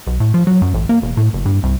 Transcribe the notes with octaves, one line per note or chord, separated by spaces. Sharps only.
B1
A2
F3
F#3
F#2
A1
A#3
E1
A2
F#1
G2
C2